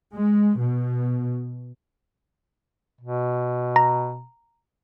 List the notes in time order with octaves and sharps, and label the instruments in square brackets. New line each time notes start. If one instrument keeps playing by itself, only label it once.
[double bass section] G#3
B2
[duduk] B2
[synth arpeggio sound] A#5